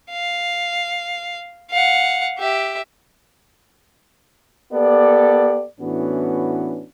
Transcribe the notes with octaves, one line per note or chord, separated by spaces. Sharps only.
F5
F5 F#5
G4 E5
A#3 B3 G4 A4 D5
A2 E3 B3 C#4 D4 F#4